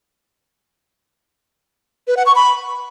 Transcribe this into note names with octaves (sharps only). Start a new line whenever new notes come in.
B4
F#5
C#6
B5